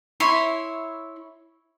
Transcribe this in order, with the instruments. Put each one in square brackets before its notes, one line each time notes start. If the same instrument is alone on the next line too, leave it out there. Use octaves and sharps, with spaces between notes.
[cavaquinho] E4 C#5 E5 C6